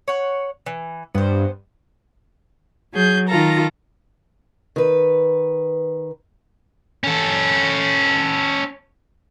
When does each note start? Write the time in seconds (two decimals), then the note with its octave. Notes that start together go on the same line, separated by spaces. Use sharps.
0.08 C#5 F#5
0.66 E3
1.15 G2 B3 C5
2.93 F#3 G#4 G6
3.28 D#3 F4 A4 A#5
4.76 D#3 B4
7.04 C#4 A4